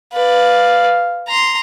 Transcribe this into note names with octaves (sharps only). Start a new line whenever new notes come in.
B4 D5 F5
A#5 C6